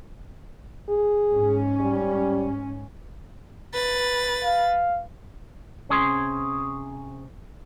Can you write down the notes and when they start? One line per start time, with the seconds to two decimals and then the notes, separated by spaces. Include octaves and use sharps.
0.89 G#4
1.30 G#2 C#4
1.80 G3
3.73 B4 A6
4.44 F5
5.89 C3 C#4 G#4 C6